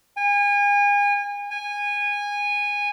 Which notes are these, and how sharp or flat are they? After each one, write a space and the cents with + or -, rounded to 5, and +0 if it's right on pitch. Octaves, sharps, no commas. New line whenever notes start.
G#5 -35
G#5 -20